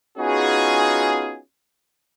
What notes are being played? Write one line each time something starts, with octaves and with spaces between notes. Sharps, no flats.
B3 C#4 D#4 F4 F#4 G#4